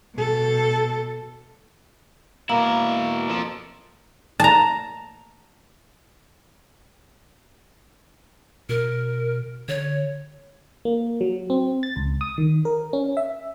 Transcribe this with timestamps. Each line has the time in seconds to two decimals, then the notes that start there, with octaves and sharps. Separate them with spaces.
0.15 B2 A4
2.49 B2 A#3 E4
3.29 F3 A4
4.40 A5 A#5
8.69 B2 A#4
9.68 D3 C#5
10.85 A#3
11.21 F#3
11.50 C4
11.83 A6
11.96 C#2
12.21 D#6
12.38 D#3
12.65 A#4
12.93 C#4
13.17 E5